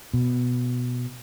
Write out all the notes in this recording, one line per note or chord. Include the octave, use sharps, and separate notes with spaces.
B2